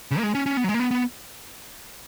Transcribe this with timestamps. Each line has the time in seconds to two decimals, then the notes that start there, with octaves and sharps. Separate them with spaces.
0.11 C#3
0.18 A#3
0.23 G#3
0.35 C#4
0.46 C#4
0.57 B3
0.64 F#3
0.69 G#3
0.74 A#3
0.80 B3
0.91 B3